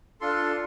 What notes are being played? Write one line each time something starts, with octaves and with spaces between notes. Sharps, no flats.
D4 F4 A4 C6